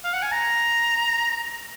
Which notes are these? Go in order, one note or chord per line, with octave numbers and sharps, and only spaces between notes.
F5
F#5
G#5
A#5